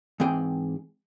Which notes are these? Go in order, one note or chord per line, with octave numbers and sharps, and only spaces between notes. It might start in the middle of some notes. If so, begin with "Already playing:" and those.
G#2 E3 C4 G#4 G5